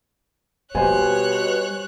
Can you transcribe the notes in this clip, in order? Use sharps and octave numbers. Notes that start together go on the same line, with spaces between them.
B2 G3 G4 C5 C#5 G#5 F#6